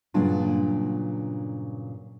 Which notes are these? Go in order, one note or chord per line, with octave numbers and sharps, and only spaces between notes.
G2 A#2 C#3 F#3 D4 F4